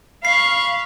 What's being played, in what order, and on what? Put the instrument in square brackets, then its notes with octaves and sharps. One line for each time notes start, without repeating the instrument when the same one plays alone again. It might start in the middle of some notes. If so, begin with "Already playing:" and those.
[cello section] F5 [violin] B5 C#6 [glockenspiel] C7